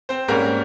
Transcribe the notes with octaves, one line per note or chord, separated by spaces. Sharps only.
C4 C5
G#2 G3 A#3 C#4 A#4